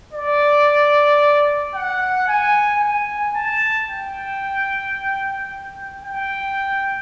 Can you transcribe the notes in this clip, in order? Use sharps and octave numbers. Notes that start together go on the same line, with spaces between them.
D5
F#5
G#5
G#5
A5
G5
G5